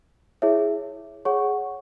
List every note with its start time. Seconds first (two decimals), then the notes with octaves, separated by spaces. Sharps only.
0.42 E4 G#4 C#5 E5
1.25 G#4 C#5 F#5 C#6